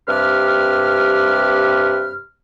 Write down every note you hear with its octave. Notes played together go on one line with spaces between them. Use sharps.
G2 C3 G4 B4 F6